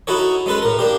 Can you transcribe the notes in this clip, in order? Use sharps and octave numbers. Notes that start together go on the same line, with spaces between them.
D#4 E4 F#4 A4 C#5
G#3 C#4 A4 B4
A2 A#4
A#3 D4 G4